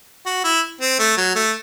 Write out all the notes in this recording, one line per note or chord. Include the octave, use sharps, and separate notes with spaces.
F#4
E4
C4
A3
F#3
A3